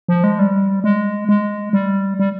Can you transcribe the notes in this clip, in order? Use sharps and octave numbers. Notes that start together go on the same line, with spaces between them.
F3
G#3
G3
G#3
G#3
G3
G3